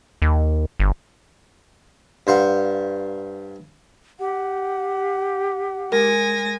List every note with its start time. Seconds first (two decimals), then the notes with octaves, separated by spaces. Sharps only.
0.22 D#2
0.80 G1
2.27 G2 C5 F5 F#5 A#5
4.20 G4 F#5
5.92 G#3 A#4 G#5 A#6